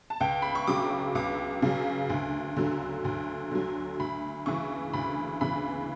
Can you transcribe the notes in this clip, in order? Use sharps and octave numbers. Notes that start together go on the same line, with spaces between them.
A5
C#2 G5
B5
C#6
C#3 F#3 D6
C#2 D6
C#3 F#3
D2
D3 F#3
D2
D3 F#3
D2 B5
C#3 E3 C#6
D2 B5
C#3 E3 B5